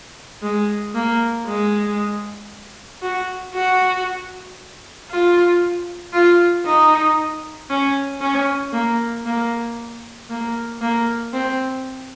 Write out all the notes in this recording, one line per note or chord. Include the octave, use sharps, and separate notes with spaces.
G#3
A#3
G#3
F#4
F#4
F4
F4
D#4
C#4
C#4
A#3
A#3
A#3
A#3
C4